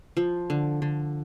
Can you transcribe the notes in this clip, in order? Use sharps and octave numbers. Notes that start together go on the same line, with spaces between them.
F3
D3
D3